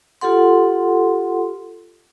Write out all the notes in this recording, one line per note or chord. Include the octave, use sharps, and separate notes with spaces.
F4 G4 A4 F#5 C6